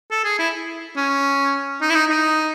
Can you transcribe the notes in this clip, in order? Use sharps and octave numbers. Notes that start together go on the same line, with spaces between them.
A4
G#4
E4
C#4
D#4
E4
D#4
D#4